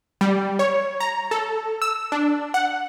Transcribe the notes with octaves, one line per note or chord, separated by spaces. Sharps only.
G3
C#5
A#5
A4
E6
D4
F#5